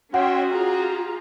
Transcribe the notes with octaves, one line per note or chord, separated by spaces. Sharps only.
C#4 F#4 C#5 D#5 E5 F#5 G5 C6
F4 G4 G#4 A#5